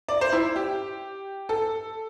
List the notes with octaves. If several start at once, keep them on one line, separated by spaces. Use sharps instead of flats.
D5
C5
E4
G4
A4